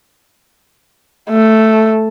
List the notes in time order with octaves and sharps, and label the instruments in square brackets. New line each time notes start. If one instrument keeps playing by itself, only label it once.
[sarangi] A3